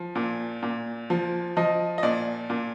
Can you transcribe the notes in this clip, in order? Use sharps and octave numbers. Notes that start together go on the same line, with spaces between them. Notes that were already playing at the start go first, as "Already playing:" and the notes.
Already playing: F3
A#2
A#2
F3
F3 D#5
D#5
A#2 D5
A#2